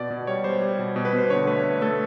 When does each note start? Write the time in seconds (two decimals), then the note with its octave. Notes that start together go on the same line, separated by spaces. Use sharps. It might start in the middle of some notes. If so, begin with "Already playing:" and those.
Already playing: B2 D5
0.10 B2
0.27 G3 C#5
0.44 G3 C5
0.62 G3
0.79 B2
0.96 B2
1.05 B4
1.13 B2 C5
1.30 D3 C#5
1.47 A3 B4
1.65 A3
1.82 A3 A4